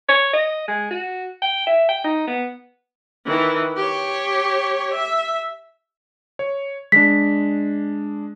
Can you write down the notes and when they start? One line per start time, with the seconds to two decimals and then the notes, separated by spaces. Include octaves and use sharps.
0.08 C#5
0.33 D#5
0.68 G#3
0.90 F#4
1.42 G5
1.67 E5
1.89 G5
2.04 D#4
2.27 B3
3.26 D#3 E3
3.77 G4 C#5
4.93 E5
6.39 C#5
6.92 G#3 D4 B6